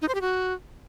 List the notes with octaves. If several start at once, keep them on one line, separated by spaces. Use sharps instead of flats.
D#4
C5
G4
F#4